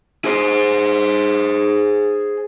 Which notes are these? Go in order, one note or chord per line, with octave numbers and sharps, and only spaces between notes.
G#4 C5